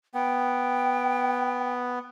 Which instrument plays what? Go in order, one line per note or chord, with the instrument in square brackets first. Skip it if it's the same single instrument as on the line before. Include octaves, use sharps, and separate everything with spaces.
[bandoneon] B3 [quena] G5